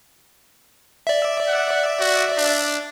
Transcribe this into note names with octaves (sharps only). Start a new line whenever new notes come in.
D5 E5
F#5
F#4
D4